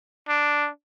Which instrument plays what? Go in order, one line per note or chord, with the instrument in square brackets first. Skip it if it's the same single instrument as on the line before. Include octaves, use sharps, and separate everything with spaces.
[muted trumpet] D4